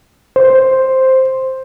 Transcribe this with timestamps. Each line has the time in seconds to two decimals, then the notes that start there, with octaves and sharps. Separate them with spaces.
0.36 C5